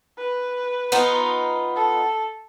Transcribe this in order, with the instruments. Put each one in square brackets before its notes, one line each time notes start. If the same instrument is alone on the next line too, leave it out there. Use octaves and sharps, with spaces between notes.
[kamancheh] B4
[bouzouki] B3 D#4 F4
[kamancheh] A4